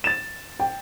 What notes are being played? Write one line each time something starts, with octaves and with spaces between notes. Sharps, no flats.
A6 E7
G5